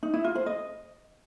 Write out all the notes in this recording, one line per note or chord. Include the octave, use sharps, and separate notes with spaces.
D#4
E4
F4
C5
D#5